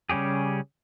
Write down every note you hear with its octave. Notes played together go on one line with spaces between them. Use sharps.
C#3 G3 C#4 G4 G#4